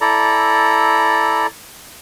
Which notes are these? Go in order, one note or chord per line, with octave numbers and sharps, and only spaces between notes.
E4 A4 D5 A#5